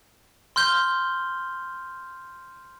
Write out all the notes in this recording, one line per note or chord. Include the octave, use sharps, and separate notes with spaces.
C6 F6 G6 G7